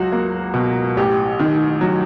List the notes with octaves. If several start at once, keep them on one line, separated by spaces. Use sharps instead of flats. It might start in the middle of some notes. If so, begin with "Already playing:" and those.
Already playing: C#2 F#3 F#4
A#3
B2
A1 G4
D#3
F#3